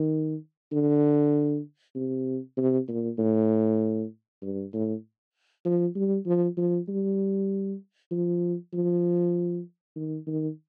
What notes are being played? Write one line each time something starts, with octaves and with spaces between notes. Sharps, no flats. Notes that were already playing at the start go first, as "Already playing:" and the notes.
Already playing: D#3
D3
C3
C3
A#2
A2
G2
A2
F3
G3
F3
F3
G3
F3
F3
D#3
D#3